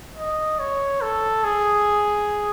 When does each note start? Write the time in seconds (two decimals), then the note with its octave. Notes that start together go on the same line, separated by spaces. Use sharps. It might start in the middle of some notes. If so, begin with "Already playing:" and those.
0.17 D#5
0.59 C#5
1.01 A4
1.44 G#4